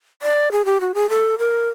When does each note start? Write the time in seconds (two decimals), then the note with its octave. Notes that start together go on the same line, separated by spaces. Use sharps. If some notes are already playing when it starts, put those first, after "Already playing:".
0.22 D5
0.52 G#4
0.65 G4
0.81 F#4
0.94 G#4
1.10 A4
1.38 A#4